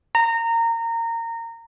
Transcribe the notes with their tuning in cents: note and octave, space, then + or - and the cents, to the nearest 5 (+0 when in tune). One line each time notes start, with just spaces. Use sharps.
A#5 -20